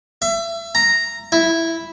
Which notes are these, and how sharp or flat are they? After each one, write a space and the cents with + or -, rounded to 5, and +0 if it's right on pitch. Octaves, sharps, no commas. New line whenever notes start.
E5 +30
A#5 -5
E4 +0